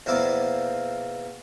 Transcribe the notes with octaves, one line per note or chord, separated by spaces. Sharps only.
E2 B2 F3 A#3 E4 D6